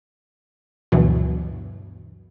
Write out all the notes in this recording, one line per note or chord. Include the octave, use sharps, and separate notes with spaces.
D2 G2 B2 E3 F#3